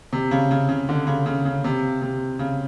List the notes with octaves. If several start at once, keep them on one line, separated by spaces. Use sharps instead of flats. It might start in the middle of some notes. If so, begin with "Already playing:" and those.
C3
C#3
C#3
C#3
D3
C#3
C#3
C#3
C3
C3
C#3